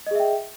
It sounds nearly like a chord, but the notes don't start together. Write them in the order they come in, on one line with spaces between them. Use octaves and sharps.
D#5 G#4 E5 G5